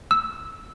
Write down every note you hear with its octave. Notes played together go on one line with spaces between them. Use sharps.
E6